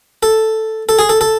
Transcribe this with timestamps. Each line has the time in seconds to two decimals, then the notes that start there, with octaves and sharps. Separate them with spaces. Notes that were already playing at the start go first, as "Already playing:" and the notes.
0.23 A4
0.89 A4
0.99 G#4
1.09 A4
1.21 A4